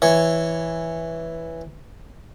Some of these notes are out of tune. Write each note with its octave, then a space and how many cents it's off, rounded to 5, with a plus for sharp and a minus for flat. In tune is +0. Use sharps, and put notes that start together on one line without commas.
E3 +0 C#5 +0